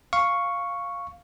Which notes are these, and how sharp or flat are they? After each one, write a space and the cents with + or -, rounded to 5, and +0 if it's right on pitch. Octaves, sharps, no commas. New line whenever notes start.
F5 +0 C#6 +0